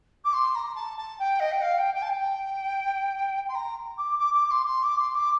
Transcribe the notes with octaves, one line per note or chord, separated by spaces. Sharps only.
D6
C6
A#5
A5
A5
G5
D#5
G5
F5
G5
G5
A5
G5
C6
A#5
D6
D6
D6
C6
C6
D6
C6
D6